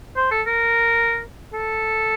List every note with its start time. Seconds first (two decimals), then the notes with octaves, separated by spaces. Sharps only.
0.17 C5
0.31 A4
0.47 A#4
1.53 A4